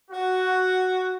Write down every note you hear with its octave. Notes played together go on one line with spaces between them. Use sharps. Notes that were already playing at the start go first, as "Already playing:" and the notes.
F#4